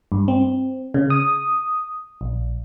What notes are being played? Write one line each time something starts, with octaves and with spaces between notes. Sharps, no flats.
G2
C4
C#3
D#6
A#1